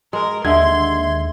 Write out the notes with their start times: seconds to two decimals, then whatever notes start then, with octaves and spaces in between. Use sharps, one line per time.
0.13 G#3 A#4
0.45 D#2 D3 G#3 E5 C6 G#6